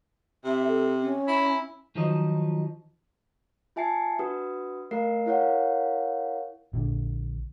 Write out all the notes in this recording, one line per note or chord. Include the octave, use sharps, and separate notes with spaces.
C3 E5
A4
C#4
E4
D#3 F3 F#3 D#4 C5 D#5
F4 E5 G#5 A5 C7 C#7
D4 F#4 B4 D#6
A3 A#4 F5 C7
E4 A#4 C#5 F5 F#5
A#1 D3